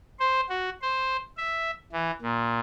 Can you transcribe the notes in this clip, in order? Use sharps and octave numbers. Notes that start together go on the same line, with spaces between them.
C5
F#4
C5
E5
E3
A#2